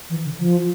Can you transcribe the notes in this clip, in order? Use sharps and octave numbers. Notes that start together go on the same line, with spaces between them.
E3
D3
F3